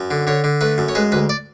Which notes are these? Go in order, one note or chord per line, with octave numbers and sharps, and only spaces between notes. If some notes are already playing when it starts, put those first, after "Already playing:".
Already playing: F#2
D3
D3 C#5
D3
A3 B4
F#2
C#5
G#3 B4
D2 B4
D5